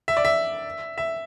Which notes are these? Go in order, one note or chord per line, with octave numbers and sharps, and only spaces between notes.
E5
D5
E5
E5